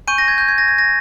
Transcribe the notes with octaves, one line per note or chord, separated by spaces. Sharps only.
G#5 C#6 G6 D#7
A#6
G#6
G6
G#6
A#6
G#6
A#6